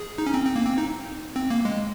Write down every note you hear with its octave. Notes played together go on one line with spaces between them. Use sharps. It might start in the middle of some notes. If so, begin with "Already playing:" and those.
Already playing: G#4
D#4
C#4
C4
C4
A#3
C4
D#4
C4
A#3
G#3